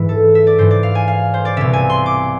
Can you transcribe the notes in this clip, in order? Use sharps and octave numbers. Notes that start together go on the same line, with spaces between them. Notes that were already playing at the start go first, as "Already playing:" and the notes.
Already playing: G#2 E3 E4
A4
E5
D5
G#2 E3 C5
D5
F5
G#5
F5
C5
D5
C2 B2 E5
G#5
C6
D6